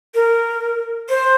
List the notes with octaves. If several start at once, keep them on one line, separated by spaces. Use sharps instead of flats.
A#4
C5